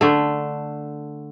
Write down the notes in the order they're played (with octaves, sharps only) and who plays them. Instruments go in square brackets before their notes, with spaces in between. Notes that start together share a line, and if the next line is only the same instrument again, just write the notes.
[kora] D3 A3